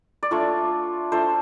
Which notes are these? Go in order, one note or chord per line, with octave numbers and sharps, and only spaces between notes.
D5
A3 D4 F4 C#5
A3 D4 F4 C5